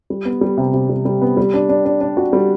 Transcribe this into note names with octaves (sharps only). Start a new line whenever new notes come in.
G3
B3
G3
C3
C3
G3
G3
B3
G3
D4
D4
D4
D4
F#4
G3